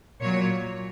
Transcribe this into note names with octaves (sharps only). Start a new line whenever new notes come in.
A#2 F#3 C#5